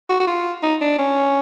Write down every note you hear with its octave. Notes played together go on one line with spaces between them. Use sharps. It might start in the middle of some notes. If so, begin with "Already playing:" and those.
F#4
F#4
F4
D#4
D4
C#4